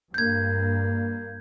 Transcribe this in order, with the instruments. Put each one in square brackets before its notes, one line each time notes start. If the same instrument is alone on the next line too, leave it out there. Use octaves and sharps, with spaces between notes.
[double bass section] G2 A#3 [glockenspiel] G6 G#6